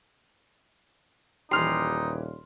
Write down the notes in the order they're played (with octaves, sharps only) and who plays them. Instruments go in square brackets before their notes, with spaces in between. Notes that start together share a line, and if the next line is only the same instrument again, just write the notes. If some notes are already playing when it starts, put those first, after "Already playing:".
[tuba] D#1 [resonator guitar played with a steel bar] E3 G4 [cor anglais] D#4 [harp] C6 F6